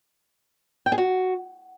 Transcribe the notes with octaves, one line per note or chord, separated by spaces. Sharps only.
G5
G#4
F#4